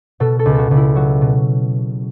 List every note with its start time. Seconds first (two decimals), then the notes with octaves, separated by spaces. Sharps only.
0.20 B2 A4
0.39 A4
0.46 C#2
0.54 F#4 A4
0.71 C#2
0.77 E4
0.95 F#3 F#4
1.21 B2